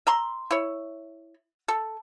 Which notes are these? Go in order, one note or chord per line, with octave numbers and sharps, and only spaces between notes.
E5 A#5 C6
E4 C#5
A4